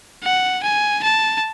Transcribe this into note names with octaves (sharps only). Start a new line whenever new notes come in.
F#5
G#5
A5